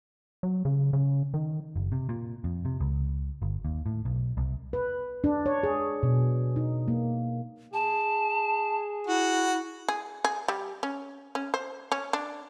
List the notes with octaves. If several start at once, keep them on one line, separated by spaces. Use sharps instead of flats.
F#3
C#3
C#3
D#3
F#1
C3
A#2
F2
C3
C#2
G1
D#2
A2
B1
C2
B4
D4
C#5
G#4
B2
D#4
A#3
G#4 A5
E4 F#4
G#4
G#4
G3
C#4
C#4
C5
C#4
D4